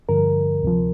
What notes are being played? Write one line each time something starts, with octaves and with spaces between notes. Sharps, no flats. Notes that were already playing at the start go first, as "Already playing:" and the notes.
G2 D3 F3 A#4
D2 C3 F3